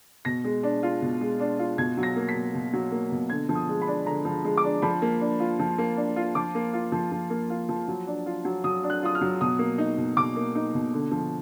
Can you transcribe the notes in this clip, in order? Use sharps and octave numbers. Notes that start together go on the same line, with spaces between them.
B2 A#6
G#3
D4
F4
B2
G#3
D4
F4
B2 G#6
F#3
A#6
A#3
B6
B2
B2
F#3
A#3
B2
D3 G#6
F3
D#6
G#3
B5
D4
D3 A#5
F3
G#3
D6
D4
F3 B5
A#3
D4
F4
F3
A#3
D4
F4
F3 D6
A#3
F4
F3
F3
A#3
F4
F3
F#3
D4
F4
F#3
F#3 D#6
D4
F#6
F4 D#6
F6
F#3
B2 D#6
A#3
D#4
B2
B2 D6
A#3
D#4
B2
D3
F3